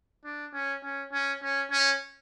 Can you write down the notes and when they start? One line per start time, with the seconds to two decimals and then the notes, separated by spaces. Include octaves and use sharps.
0.25 D4
0.54 C#4
0.83 C#4
1.13 C#4
1.42 C#4
1.71 C#4